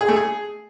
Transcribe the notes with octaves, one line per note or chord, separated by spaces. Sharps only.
G#4
A3
G#4